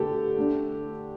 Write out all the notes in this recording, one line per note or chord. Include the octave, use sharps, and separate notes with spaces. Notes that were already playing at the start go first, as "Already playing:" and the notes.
Already playing: D3 A3 D4 G4 A4
D3 A3 D4